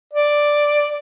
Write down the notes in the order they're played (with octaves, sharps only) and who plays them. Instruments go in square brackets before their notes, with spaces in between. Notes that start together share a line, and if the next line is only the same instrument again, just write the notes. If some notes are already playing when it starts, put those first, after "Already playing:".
[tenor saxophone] D5